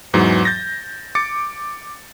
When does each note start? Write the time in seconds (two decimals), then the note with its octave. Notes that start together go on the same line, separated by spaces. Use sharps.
0.13 E2 G#2 E3 F#3
0.45 G6 A6 A#6
1.15 D6 A6 C#7